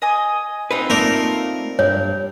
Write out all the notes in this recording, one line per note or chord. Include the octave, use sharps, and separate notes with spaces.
D#5 G#5 D#6
C4 D#4 F4 B4
A3 A#3 A#4 D5
G2 C#5